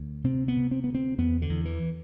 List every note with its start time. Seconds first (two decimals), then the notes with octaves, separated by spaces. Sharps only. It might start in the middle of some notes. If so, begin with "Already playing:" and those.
Already playing: D2
0.24 C3 C4
0.48 B3
0.57 C3
0.71 C4
0.84 D2 B3
0.94 C4
1.18 E2 B3
1.42 D3
1.50 E2
1.65 E3